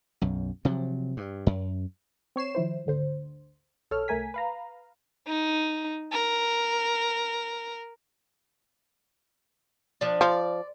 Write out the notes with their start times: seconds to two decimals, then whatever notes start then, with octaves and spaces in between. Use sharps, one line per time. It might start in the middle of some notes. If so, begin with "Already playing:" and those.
0.21 B1 F#2
0.65 C3 F3 F#3
1.17 G2
1.47 F#2
2.36 C4 C#5 C7 E7
2.55 D#3 F3 E4 C5
2.86 G#1 D2 D3 C5
3.91 B1 A4 C#5 F6
4.08 C2 A3 A#4 G#5 B6
4.34 B4 F5 A#5
5.28 D#4
6.12 A#4
10.01 F3 D4
10.21 F3 D5